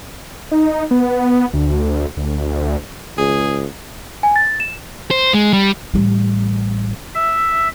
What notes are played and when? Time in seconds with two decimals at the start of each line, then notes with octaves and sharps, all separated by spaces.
0.52 D#4
0.91 B3
1.54 D2
2.17 D2
3.18 C#2 G#4
4.23 G#5
4.36 A6
4.60 E7
5.11 C5
5.34 G#3
5.53 G3
5.94 A1 G3
7.15 E5